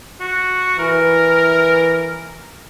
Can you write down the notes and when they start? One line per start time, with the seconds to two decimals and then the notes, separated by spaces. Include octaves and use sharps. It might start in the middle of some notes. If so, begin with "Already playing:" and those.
0.20 F#4
0.79 E3 A#4